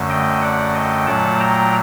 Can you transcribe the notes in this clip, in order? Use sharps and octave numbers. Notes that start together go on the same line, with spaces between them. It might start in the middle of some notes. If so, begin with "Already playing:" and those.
Already playing: F#2 D3 A3
D#5 G5
D5 F#5
D#5 G5
A#2 F#3 A3 F#5 A5
G5 A#5